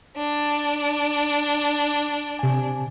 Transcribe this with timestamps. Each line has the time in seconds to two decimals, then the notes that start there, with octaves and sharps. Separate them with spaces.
0.17 D4
2.39 C3 G#5